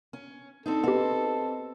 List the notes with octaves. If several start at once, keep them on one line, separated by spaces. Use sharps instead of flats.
C#4
C4 D4 D#4 A4
B3 C4 G4 B4 D#5